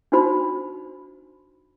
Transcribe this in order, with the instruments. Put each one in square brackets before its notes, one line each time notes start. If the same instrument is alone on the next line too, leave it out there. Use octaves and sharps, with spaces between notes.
[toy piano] D4 D#4 F#4 C5 B5